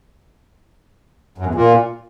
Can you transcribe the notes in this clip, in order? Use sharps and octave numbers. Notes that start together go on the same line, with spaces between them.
F#2
E2
A#2